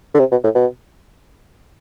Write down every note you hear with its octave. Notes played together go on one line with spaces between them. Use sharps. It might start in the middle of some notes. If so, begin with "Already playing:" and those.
D3
C3
B2
A2
B2